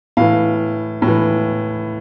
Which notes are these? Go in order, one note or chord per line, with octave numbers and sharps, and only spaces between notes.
A2 E3 F5
A2
E3